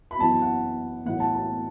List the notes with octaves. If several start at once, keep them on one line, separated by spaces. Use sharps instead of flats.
B5
F#2 E3 B3 A5
F#5
B1 A2 E3 B3 F#5
A5
A5